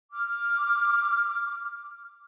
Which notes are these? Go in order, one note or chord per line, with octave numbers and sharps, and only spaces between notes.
D6 F6